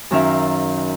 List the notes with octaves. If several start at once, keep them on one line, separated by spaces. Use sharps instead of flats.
F#2 D#3 C#4 E5 F5